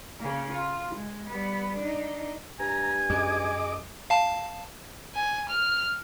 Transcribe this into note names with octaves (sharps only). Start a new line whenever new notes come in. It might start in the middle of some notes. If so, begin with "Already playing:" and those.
C#3 A#3
F4
G#3
G3 B3
D4 D#4
G2 G#5 A#5
F#2 G#4 D#5 D6
F5 A5
G#5
F6